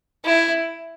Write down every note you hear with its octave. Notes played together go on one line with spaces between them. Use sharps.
E4